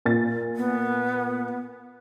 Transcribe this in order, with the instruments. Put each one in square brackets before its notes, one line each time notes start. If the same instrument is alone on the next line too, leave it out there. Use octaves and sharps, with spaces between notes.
[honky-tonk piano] A#2 A6
[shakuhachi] B3